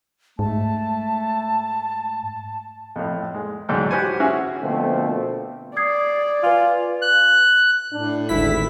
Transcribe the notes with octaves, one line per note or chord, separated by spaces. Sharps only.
G#2 A3 A5
F2 A2
G#3
D2 G#2 F#3 G5
F#4 G4 B4 C5 F#5 G#5
C#4 E4 F#4 G#4
B2 D3 F3 A3 A#3 C4
D5 D#6 G#6 C7
F4 B4 G#5
F#6
A2 D4
G#1 D2 E4 B6